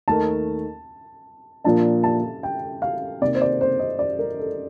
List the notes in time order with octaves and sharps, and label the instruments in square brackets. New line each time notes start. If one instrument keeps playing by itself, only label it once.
[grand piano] D#2 D#3 A3 D#4 A#4 [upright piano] A5
[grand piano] A#2 F3 A#3 D4 [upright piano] A5
[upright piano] A5
G5
F5
[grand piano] C3 D#3 A#3 [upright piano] D5
[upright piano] C5
D5
C5
D#5
D5
A#4
A4